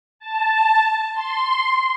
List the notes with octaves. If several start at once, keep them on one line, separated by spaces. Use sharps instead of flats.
A5
C6